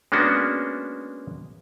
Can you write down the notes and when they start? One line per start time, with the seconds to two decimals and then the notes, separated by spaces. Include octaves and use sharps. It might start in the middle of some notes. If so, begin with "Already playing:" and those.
0.12 G#3 A#3 B3 C#4 D4 F#4